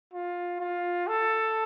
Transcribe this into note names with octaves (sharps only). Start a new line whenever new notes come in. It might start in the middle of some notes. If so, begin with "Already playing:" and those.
F4
F4
A4